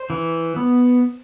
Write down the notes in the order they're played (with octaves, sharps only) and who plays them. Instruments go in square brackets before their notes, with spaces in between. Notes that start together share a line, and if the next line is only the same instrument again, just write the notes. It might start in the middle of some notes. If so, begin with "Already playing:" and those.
Already playing: [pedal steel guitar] C5
E3
B3